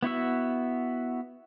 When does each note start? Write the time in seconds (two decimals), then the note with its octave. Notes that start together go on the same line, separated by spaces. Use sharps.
0.03 B3 E4 F#4 E5